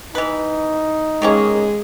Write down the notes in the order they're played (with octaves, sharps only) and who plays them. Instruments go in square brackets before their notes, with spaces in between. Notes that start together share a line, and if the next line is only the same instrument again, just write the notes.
[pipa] E3 B4 [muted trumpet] D#4
[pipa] D#3 A#3 C#4 [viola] G#3 G#4